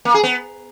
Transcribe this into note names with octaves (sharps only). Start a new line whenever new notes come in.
A#3
G#4
B3